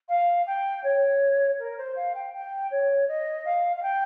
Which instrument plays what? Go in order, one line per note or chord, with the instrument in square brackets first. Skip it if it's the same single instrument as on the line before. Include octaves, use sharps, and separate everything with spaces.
[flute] F5
G5
C#5
A#4
C5
F5
G5
G5
C#5
D#5
F5
F5
G5